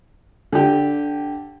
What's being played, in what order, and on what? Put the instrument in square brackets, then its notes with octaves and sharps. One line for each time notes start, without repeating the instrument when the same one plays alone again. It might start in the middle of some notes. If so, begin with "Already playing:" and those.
[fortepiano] D3 G4